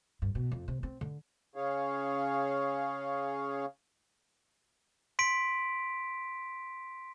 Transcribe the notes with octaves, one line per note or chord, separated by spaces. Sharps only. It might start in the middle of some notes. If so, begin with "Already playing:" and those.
G2
B2
F2
C3
C4
D3
C#3 C#4 G#4 C#5 F5
C6 B6 D7